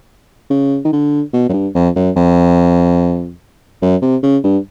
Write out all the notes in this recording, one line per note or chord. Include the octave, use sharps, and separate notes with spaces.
C#3
D#3
D3
B2
F#2
G2
F2
F#2
F2
F#2
C3
C#3
G2